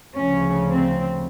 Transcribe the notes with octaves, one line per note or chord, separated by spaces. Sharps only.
D2 C#3 F3 C#4
C4